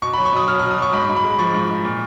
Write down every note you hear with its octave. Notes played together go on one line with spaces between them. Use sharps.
B2 C#6
B5
F#3
C#6
B2 D#6
F#3 F6
F6
B2
D#6
F#3 C#6
G#2 B5
G#2
B5
G#3
B5
F3 C#6
G#2
G#2
A#2